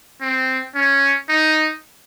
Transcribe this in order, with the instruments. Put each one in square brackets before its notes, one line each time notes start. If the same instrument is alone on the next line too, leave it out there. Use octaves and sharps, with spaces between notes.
[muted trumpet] C4
C#4
D#4